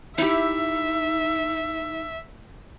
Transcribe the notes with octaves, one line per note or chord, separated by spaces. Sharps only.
D#4 E4 G4 E5